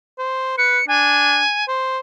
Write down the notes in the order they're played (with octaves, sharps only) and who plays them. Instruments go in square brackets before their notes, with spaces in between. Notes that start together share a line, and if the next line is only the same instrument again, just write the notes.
[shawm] C5
[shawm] B4 [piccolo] C#7
[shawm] D4 [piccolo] G#5
[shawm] C5